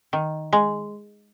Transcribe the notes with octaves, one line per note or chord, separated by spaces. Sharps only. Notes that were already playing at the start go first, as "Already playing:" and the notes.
D#3
G#3